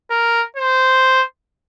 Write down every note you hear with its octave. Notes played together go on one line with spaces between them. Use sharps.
A#4
C5